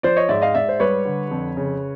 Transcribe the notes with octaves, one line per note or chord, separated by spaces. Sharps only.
F3 C5 D5
C#5 D#5
G#2 D5 E5
D#5 F5
G#2 D5 E5
C5
G3 B4 C#5
D3
F2
C#3